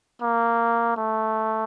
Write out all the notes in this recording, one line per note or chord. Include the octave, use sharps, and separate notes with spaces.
A#3
A3